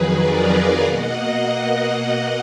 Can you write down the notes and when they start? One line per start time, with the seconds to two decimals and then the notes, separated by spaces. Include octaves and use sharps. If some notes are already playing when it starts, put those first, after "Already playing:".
Already playing: F2 D#3 F#3 G#4 B4
0.14 A#4 D5
0.49 D5 F5
0.83 B2 A#3 D#5 F#5